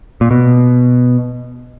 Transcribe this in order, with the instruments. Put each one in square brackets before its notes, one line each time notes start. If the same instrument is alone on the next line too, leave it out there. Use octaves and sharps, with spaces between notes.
[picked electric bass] A#2
B2